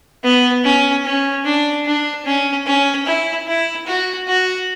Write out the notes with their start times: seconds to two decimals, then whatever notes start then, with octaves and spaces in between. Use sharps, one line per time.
0.23 B3
0.64 C#4
1.05 C#4
1.45 D4
1.85 D4
2.25 C#4
2.66 C#4
3.06 E4
3.47 E4
3.86 F#4
4.28 F#4